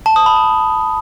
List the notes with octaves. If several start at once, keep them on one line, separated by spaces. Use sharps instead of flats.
A5
D#6
B5
A5